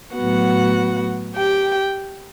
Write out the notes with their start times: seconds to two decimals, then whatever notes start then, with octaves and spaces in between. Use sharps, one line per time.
0.15 A2 F#3 B3 F#4 F#5
1.35 G4 G5